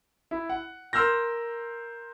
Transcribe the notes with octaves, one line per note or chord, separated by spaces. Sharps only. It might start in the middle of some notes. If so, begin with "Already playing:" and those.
E4
F#5
A#4 C6 E6 F6 G6 A#6